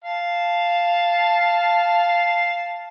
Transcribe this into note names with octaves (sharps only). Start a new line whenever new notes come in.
F5 A5